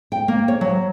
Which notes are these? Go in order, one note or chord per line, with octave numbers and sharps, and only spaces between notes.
G5
A#3
C#5
F#3